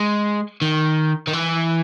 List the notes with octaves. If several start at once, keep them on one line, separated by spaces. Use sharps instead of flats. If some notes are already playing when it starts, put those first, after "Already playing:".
Already playing: G#3
D#3
D#3
E3